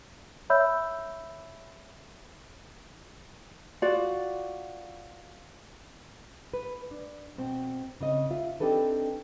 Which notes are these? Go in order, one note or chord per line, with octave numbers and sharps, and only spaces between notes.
C#5 E5 B5 E6 G6
F4 F#4 D5
B4
D4
B2 C4
C#3 C4 D#5
F4 E5
C4 D4 D#4 G4 A4 B4